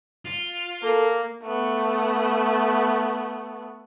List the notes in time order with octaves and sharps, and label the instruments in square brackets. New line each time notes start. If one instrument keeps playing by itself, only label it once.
[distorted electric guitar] F4
[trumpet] A#3 [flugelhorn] A4 [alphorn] A#4
[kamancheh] A3 B3